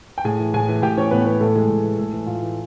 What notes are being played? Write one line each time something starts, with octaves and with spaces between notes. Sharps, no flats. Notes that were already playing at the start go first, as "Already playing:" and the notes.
G5
A2 G#4 G#5
E3
A2 G#4 G#5
E3
A2 G4 G5
E3 C#4 C#5
A2 B3 B4
E3 B3 B4
A2 A3 A4
E3 G#3 G#4
A2
E3
A2 A3 A4
E3
A2 F4
E3